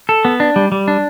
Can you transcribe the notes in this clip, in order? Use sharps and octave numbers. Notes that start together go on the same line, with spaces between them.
A4
B3
D4
G3
G3
D4